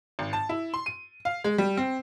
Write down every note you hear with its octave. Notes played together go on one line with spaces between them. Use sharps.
G#1
A5
E4
C6
D#7
F5
G#3
G3
C4